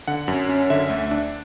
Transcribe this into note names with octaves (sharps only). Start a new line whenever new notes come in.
D3 F#5
F#2
C#4
D3 E5
D2
D4